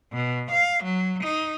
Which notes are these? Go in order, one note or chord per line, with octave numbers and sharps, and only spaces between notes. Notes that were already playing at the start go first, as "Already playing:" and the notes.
B2
F5
F#3
D#4